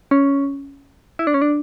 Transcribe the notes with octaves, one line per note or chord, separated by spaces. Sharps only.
C#4
E4
D4
C#4
D4